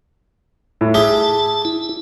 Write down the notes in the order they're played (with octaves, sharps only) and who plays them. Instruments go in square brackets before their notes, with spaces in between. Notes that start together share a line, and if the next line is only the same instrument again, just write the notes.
[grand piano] A2
[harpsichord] G4 G#4 E5 [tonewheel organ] A5 [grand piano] G7
[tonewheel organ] E4